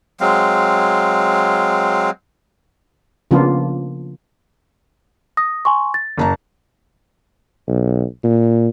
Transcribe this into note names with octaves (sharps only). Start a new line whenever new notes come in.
F#3 G#3 C4 F5
C#3 F3 A#3 B3 D4 F4
D#6 A#6
G#5 C6 C#6
A6
F#1 A5 A#5
B1
A#2